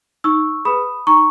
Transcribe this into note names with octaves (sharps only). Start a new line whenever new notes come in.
D#4 C#6 E6
G#4 B4 B5 D#6
D#4 A#5 C#6